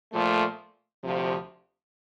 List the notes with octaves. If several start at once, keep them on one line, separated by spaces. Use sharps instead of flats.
A#2 F3 A3
D2 C3 F3